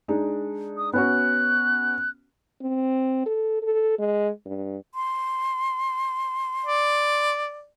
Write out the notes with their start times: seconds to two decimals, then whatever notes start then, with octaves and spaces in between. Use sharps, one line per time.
0.08 G#3 D4 D#4
0.77 D#6
0.93 B3 C#4 F#4 F#6
2.62 C4
3.26 A4
3.63 A4
3.99 G#3
4.46 G2
4.95 C6
6.66 D5